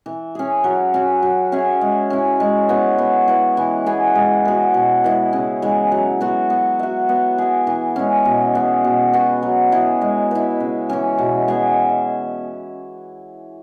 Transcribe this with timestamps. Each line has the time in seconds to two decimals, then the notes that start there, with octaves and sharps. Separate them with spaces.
0.06 E3
0.35 C#4 G#4
0.64 F#3
0.94 C#4 F#4
1.23 F#3
1.52 C#4 G#4 E5
1.81 G#3
2.10 C#4 E4
2.40 G#3
2.69 B3 E4 C#5
2.98 B3
3.28 E4 B4
3.57 E3
3.86 B3 G#4
4.15 G#3
4.45 B3 F#4
4.74 B2
5.04 G#3 E4 B4
5.33 C#3
5.62 E3 G#3
5.92 F#3
6.21 B3 F#4
6.50 B3
6.79 F#4 E5
7.09 B3
7.38 G#4 E5
7.67 E3
7.96 G#3 C#4
8.25 B2
8.55 B3 G#4
8.84 B2
9.13 B3 F#4
9.42 F#3
9.72 E4 G#4
10.02 G#3
10.31 E4 B4
10.60 C#3
10.89 E3 C#4
11.19 B2
11.48 B3 G#4 E5